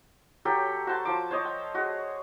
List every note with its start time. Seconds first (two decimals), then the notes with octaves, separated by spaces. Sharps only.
0.45 F#3 G4 A4 G5
0.87 F#4 C5 A5 C6
1.05 F3 D6
1.31 C5 C#5 D#5 D6
1.45 G5
1.74 G#3 F#4